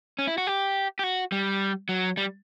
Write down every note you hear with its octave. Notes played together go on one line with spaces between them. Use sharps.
C#4
E4
F#4
G4
G4
F#4
G3
F#3
G3